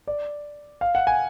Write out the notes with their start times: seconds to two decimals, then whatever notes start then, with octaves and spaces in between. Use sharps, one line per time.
0.07 D5
0.81 F5
0.95 F#5
1.07 G#5